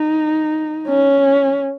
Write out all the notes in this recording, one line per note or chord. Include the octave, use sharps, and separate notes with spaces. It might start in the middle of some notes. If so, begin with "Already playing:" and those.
Already playing: D#4
C#4